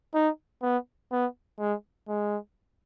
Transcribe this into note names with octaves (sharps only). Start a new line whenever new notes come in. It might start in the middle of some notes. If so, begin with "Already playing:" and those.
D#4
B3
B3
G#3
G#3